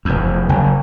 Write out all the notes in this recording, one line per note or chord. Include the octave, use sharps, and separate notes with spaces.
F1 E2
F#1